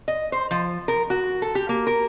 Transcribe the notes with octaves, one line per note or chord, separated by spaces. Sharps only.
D#5
C5
F3
A#4
F#4
A4
G4
A#3
A#4